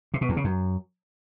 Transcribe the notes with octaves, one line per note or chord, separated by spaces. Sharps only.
C3
B2
E2
C#3
F#2